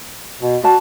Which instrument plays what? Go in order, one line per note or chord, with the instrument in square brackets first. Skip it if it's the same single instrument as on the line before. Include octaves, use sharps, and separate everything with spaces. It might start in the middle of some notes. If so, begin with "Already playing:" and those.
[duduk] B2
[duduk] F#4 [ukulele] D5 A5